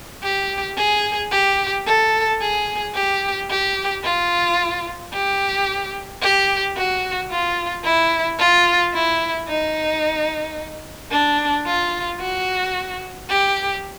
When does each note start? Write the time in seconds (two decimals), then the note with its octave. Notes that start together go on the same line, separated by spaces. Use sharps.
0.24 G4
0.77 G#4
1.32 G4
1.87 A4
2.41 G#4
2.95 G4
3.50 G4
4.04 F4
5.13 G4
6.22 G4
6.77 F#4
7.30 F4
7.84 E4
8.39 F4
8.94 E4
9.48 D#4
11.12 D4
11.66 F4
12.20 F#4
13.29 G4